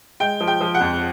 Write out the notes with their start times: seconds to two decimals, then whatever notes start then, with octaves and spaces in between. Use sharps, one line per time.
0.20 G#3 G5
0.41 F3
0.48 G5
0.61 F3
0.74 F#5
0.81 F2